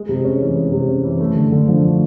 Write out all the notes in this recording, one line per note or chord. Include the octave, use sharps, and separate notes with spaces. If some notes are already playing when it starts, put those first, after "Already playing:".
Already playing: G#3
C3
C#4
E3
G#3
C3
C#4
E3
A3
D3
D3
F3
A3